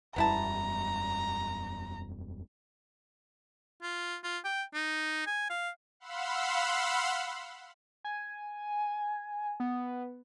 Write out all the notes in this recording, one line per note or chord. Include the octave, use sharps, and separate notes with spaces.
E1 F#2 G3 B3 E4 A5 A#5
F4
F4
G5
D#4
G#5
F5
F5 F#5 B5 C6 E6
G#5
B3